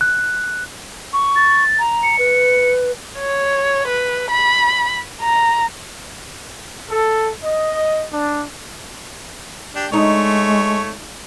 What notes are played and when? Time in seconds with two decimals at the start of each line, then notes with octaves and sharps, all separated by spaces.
0.01 F#6
1.13 C#6
1.36 A6
1.79 A#5
2.03 C#7
2.19 B4
3.19 C#5
3.88 B4
4.31 B5
5.21 A#5
6.89 A4
7.43 D#5
8.12 D4
9.75 D4 G4 G5
9.92 G#3 A3 D4 D#4 C#5